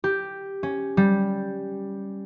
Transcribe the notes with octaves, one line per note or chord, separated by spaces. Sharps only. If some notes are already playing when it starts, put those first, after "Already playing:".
G4
C#4
G3